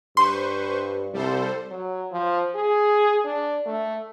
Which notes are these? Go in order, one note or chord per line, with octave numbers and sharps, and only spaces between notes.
G2 B4 C5 C6 C#6
C2 G3 A4 C5
F#3
F3
G#4
D4
A3